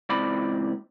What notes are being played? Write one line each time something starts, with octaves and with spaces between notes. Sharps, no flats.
C#2 A#2 E3 C4 D5 B5